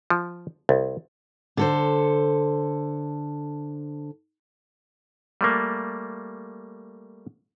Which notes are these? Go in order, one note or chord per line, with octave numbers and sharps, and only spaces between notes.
F3
C2
D3 A4 C5
G3 A3 A#3